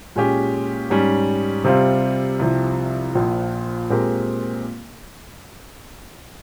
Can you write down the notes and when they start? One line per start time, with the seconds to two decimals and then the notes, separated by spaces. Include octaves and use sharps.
0.16 A#2 G#3 C#4 G4
0.90 G#2 G3 C#4
1.64 C3 G3 C4 F4 C5
2.39 C2 C3 F3
3.15 A#1 A#2 F3
3.90 A#2 G#3 C4 G4 A#4